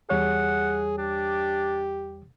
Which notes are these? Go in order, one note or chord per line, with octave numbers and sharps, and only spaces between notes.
E2 G3 G#4 C#5 F#5
D4 G4